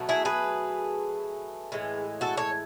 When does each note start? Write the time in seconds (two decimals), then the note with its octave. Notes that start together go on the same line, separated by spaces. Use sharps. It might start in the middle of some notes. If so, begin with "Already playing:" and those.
Already playing: B2 F#3 A3
0.09 E4 G#4
0.25 G#4 B4
1.72 A2 E3 G#3
2.21 F#4 A4
2.37 A4 C#5